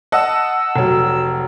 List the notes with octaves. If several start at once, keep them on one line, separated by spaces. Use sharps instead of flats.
D#5 F#5 A5 E6
F1 F#3